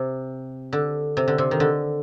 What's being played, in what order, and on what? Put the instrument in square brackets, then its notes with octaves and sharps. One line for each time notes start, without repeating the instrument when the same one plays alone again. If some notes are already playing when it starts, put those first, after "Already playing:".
Already playing: [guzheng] C3
D3
C3
D3
C3
D#3
D3